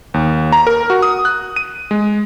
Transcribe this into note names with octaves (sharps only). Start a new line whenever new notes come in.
D#2
A#5
A#4
F#4
D#6
F#6
D#7
G#3